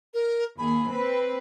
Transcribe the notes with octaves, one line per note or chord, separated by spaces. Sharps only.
A#4
D#2 G#4 B5
C4 B4